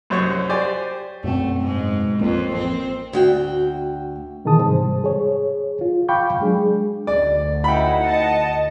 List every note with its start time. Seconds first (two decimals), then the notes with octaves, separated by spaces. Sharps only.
0.10 C2 F#2 C5 C#5 C#6
0.49 G4 C5 D5 G#5
1.24 F#2 B2 A3 C4
1.60 G#2
2.19 A1 F2 A#3
2.58 C4
3.13 D2 F#4 G5
4.45 B2 D#3 E3 G#4 A5 D#6
4.59 G#2 C3 G3 C5
5.04 G#4 C#5
5.81 F4
6.09 F5 G5 B5 C#6 D6 G6
6.41 F#3 G#3 D4 G#4
7.07 D2 D5
7.64 D#4 E4 F#5 G5 B5
8.04 D#5 A5